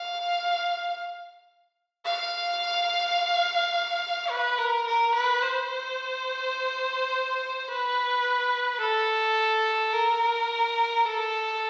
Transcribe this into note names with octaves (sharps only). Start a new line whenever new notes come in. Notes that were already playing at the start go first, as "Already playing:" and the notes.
Already playing: F5
F5
B4
A#4
A#4
B4
C5
B4
A4
A#4
A4